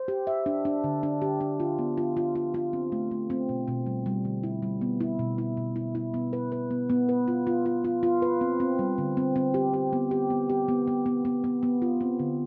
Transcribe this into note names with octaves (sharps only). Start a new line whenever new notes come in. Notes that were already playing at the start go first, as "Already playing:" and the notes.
Already playing: C5
G4
E5
D4
D4
D3
D4
G4
D4
F4
B3
F4
F4
F4
F4
C4
A3
A3
C4
B2
B2
G3
G3
D3
E4
G3
B3
E4
B2
E4
B2
E4
E4
B3
B4
B4
B3
B3
B4
F4
F4
F4
F4
F4
B4
C4
C4
G3
D3
C4
C4
G4
G4
B3
G4
B3
G4
B3
B3
B3
B3
B3
B3
F4
C4
D3